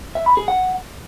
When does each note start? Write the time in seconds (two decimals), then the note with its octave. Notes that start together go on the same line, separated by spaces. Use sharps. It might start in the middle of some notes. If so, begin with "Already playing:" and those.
0.15 E5
0.26 B5
0.37 G#4
0.48 F#5